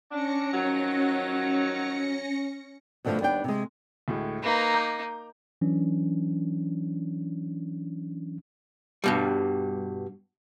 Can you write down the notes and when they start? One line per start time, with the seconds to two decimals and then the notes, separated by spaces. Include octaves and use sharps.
0.11 C#4 D4 A#6 C#7
0.52 D#3 F3 F#3
3.05 G2 B2 D3 E3 F3 A3
3.20 D#2 G3 B3 D4 G5
3.44 C3 G#3
4.08 D2 A2 G#3
4.43 A#3 D#4 B4 B5
4.74 A#5 D6 G6
5.61 E3 F#3 C#4 D4
9.04 G2 B2 G3